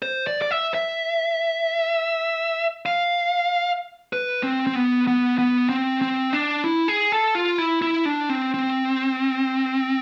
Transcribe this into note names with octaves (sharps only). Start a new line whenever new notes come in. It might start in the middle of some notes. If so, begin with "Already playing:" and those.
C5
D5
D5
E5
E5
F5
B4
C4
C4
B3
B3
B3
C4
C4
D4
E4
G#4
A4
F4
E4
E4
D4
C4
C4